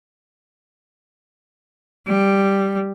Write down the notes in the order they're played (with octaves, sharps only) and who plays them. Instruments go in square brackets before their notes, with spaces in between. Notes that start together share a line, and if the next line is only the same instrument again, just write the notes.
[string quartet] G3